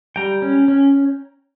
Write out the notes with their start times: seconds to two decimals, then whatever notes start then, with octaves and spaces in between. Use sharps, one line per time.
0.16 G3 G5 A#5
0.42 C#4
0.68 C#4